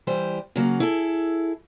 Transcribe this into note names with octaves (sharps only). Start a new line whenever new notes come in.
E3 G3 C5
C#3 F#3 A#3
E4 G#4 A4